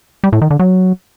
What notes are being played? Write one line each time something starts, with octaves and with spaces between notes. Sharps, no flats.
G3
A2
D#3
D3
F#3